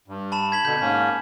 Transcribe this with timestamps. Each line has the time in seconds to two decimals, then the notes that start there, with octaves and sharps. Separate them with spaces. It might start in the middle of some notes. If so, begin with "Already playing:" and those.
0.08 G2
0.32 A5 B5 E7
0.52 G#6 B6 F#7
0.65 B2 D3 G6
0.81 G#2 A#3 C#4